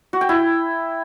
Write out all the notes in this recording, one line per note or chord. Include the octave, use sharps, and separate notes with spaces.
F#4
G5
E4